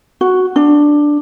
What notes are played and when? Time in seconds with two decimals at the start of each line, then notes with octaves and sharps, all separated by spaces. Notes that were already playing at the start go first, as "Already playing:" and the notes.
0.21 F#4
0.56 D4